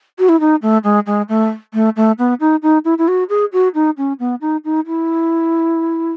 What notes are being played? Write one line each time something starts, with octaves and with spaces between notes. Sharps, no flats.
F#4
E4
D#4
A3
G#3
G#3
A3
A3
A3
B3
D#4
D#4
E4
E4
F#4
G#4
F#4
D#4
C#4
B3
D#4
D#4
E4